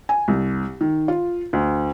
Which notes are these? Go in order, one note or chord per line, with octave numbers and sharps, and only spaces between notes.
G#5
C2
D#3
F4
D2